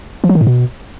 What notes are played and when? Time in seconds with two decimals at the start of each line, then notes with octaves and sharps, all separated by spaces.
0.24 F3
0.29 F#3
0.35 D#3
0.41 A2
0.47 B2